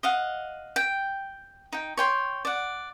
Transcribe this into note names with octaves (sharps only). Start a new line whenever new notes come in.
D#5 F5 F#5
G5
D#4 G5
C#5 G5 C6
D5 F#5